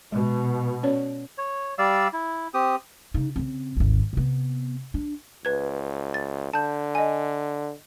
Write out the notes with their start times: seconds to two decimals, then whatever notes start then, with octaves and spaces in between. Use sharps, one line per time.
0.12 B2 G#3
0.83 C#4 C#5 D5
1.38 C#5
1.78 G3 D5 F5 E6
2.13 E4
2.54 C4 G4 D#6
3.14 C#3 D#4
3.36 C#3 C4
3.77 G#1 D2
4.13 C3 B3
4.94 D4
5.45 C#2 B4 G#6
6.14 A6
6.53 D3 A5 G6
6.95 D#5 G#5